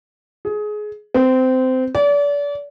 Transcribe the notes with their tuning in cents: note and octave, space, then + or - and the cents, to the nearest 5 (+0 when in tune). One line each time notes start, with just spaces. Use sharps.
G#4 +20
C4 -20
D5 -35